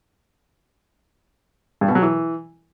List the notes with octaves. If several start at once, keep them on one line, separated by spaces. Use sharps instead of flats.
G2
B2
F#3
E3